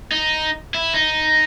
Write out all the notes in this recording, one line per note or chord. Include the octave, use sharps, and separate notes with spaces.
D#4
E4
D#4